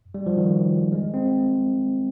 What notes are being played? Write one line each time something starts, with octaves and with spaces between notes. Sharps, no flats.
G3
F3
D#3
G#3
C4